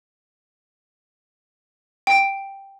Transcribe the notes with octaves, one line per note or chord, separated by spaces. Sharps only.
G5